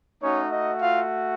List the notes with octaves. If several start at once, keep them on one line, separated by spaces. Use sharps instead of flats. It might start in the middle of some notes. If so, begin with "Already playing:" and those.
A3 C#4 D#4 F#4 C#5
D#4 D#5
F4 F5